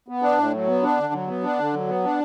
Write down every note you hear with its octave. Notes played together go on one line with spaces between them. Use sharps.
B3
D4
A2
F#3
B3
D4
D3
F#3
B3
D4
D3
F#3
B3
D4